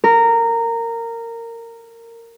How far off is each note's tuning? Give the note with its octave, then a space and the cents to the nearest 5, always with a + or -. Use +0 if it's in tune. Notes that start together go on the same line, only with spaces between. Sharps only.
A#4 -15